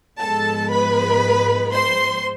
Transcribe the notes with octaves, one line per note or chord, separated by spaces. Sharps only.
G#2 F3 G#3 B3 A4 A5
B4 B5
C5 C6